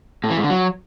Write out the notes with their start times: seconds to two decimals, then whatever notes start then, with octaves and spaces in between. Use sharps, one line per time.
0.24 A2
0.30 E3
0.37 G#2
0.43 D3
0.50 F#3